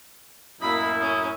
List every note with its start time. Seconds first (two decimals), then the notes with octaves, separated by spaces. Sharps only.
0.61 F#2 A2 A#3 E4 D#5 B5
1.00 C#4 D#6